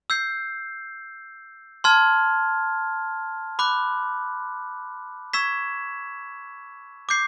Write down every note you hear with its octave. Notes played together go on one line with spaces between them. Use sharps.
E6 G6 C7
A5 C6 F6 G#6
B5 D6 F#6
C#6 E6 G#6 B6 E7
D6 G6 C7